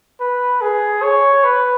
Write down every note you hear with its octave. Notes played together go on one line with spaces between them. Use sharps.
B4
G#4
C#5
B4